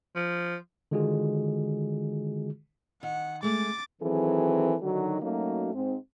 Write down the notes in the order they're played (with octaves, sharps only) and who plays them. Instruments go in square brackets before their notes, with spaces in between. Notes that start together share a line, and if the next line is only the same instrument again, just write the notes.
[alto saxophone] F3
[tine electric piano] D3 D#3 G#3 F4 F#4 G#4
[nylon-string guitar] D#3 [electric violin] F#5
[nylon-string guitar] G#3 A3 [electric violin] D6 A6
[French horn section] D#3 E3 F#3 C4 G#4 A4
D3 D#3 F#3 D#4 F#4
F#3 A3 A#3 C#4 D#4 F#4
G#2 C4